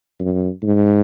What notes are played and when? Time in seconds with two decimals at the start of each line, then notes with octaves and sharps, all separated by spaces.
0.20 F#2
0.63 G#2